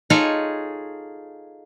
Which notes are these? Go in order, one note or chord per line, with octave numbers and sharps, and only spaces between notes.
D#4 F4 G#4 A4 C#5 G#5